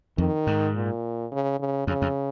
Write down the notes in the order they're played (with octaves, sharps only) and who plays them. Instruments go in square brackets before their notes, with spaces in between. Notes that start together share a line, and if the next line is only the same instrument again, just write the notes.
[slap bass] F2 [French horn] D#3
[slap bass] G#2
[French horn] A#2
C#3
C#3
[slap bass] F2 [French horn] C#3
[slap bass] F2